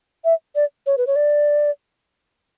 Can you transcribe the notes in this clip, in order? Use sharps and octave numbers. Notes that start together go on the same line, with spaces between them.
E5
D5
C#5
B4
C#5
D5